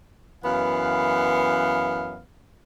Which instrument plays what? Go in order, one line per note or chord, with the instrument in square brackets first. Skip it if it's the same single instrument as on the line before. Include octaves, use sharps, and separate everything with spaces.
[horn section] F#2 E3 B3 F5